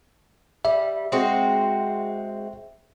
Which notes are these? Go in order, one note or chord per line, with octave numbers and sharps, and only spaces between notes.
G3 E5
G#3 C4 F#4